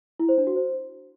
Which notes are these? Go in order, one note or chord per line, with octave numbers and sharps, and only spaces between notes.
E4
C5
D4
F#4
C5